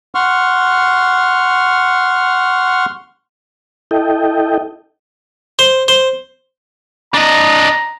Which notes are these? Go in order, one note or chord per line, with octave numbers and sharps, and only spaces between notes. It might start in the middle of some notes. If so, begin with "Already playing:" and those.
F#5 C6 C#6 F6
E4 A4 D#5 G5
C5
C5
D4 D#5 A#5